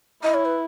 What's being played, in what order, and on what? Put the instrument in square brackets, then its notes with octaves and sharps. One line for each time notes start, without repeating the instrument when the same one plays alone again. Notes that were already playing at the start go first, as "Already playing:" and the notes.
[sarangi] E4 [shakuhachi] D#5
[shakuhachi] C#5
B4